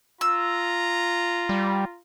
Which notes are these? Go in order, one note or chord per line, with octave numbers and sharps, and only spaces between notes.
F4 A#5 E6
G3